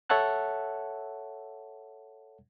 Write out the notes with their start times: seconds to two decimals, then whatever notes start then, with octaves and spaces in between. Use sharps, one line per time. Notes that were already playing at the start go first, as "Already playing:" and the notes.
0.09 A4 C#5 E5 F#5 A5 F#6